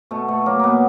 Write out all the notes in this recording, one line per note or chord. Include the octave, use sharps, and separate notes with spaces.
B2 A3
B2 A3
F#3 A#3
B2 A#3 B3